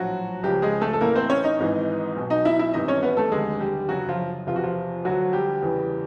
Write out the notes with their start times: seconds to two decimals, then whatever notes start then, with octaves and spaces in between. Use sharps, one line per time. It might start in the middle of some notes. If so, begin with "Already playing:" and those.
Already playing: A#1 A2 F3 F#3 F#4
0.43 C#2 C#3 F3 G3 G4
0.62 G#3 G#4
0.81 A3 A4
0.93 A4
1.01 A1 A2 E3 A#3 A#4
1.15 C4 C5
1.30 C#4 C#5
1.44 D#4 D#5
1.59 G#1 G#2 E3
2.16 B1 B2
2.30 D#4 D#5
2.45 E4 E5
2.59 E4 E5
2.74 G#1 G2 E3 D#4 D#5
2.88 C#4 C#5
3.03 B3 B4
3.17 A3 A4
3.32 F1 D#2 D3 G#3 G#4
3.60 G3 G4
3.89 G1 F#2 C#3 F#3 F#4
4.09 F3 F4
4.47 E2 C3 F3 F4
4.56 F#4
4.64 F3 F4
5.05 D2 D3 F3 F#3 F#4
5.33 G3 G4
5.62 E2 C#3 E3